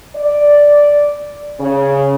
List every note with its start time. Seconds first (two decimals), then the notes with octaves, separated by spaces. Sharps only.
0.16 D5
1.60 C#3